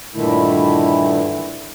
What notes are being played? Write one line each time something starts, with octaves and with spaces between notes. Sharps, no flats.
G2 A#2 D3 D#3 A3 E4